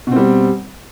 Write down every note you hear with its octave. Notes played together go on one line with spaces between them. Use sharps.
B2 G3 C4